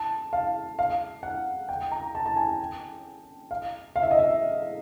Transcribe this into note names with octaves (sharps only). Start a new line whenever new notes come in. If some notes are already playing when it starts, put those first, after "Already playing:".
Already playing: A5
F5
F5
F#5
G5
A#5
A5
A5
G#5
G5
F5
F5
E5
D#5
E5